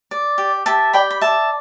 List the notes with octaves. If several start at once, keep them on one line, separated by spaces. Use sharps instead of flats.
D5
G4
G4 E5 A5
D5 G5 B5
B5
D5 E5 A5